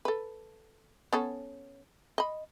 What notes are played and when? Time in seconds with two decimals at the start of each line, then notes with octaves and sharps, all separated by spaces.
0.05 A4 B4
1.13 B3 C#4 A4
2.18 D#5 B5